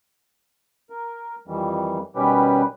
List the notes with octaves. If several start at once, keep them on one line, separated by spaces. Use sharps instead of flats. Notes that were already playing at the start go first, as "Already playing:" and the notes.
A#4
F2 D#3 E3 G3
B2 D#3 G3 C#4 G4 B4